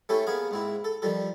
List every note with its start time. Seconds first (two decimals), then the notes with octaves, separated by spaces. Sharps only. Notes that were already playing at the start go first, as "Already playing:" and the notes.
0.09 A3 C#4 E4 G4 A4
0.27 A#3 B3 G#4 F5
0.51 G#2 C4 E4
0.84 A4
1.02 D#3 F3 G3 A4